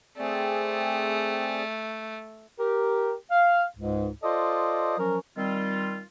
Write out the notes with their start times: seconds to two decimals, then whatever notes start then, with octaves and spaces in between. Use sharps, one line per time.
0.18 A3 C4 G#4 D5
2.59 G4 A#4
3.30 F5
3.77 C#2 G#2
4.23 F4 A4 C5 D5 D#5
4.98 F3 F#3 C#4 A#4
5.37 D#3 G3 C4 F4